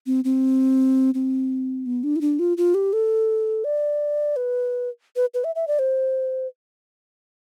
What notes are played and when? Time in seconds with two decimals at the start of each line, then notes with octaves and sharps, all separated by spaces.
0.06 C4
0.24 C4
1.14 C4
1.86 B3
2.04 D4
2.16 E4
2.21 D4
2.39 F4
2.57 F4
2.74 G4
2.93 A4
3.64 D5
4.36 B4
5.16 B4
5.34 B4
5.44 E5
5.55 E5
5.68 D5
5.79 C5